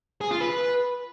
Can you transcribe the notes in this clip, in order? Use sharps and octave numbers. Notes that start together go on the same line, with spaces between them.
G#4
F4
B4